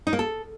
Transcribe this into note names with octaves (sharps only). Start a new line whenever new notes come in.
D#4
A#3
A4